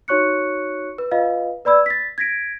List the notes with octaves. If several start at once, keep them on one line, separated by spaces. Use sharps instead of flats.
D#4 F#4 C#5 C#6 F#6 C#7
B4
F4 B4 D#5 F5
B4 D5 B5 E6 G#6
A6 B6
G#6 A#6 B6 D7